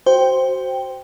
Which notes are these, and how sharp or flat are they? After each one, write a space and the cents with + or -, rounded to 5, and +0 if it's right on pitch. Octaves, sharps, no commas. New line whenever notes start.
F#4 +20 C5 +0 G5 +0